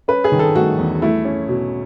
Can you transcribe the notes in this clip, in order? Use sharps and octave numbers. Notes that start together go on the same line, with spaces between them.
C#4 B4
G#4
D#3
A4
A3 F#4
E2
A3 E4
C#4
B2